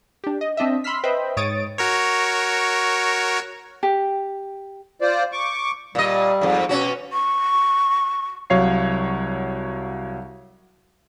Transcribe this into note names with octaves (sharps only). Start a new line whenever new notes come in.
D4 G4
D#5
C4 D4 D#5 E5
B5 C6 E6 F6 B6
B4 C5 D#5 E5 G5 B5
G#2 C#5 D#6 A6 D7
F#4 A#4 C#5
G4
F4 C5 D5
C#6 D6
A#2 G3 D#5
F2 G#2
B2 C#4 F#4
C#6
C2 F#3 C#5 F5 C7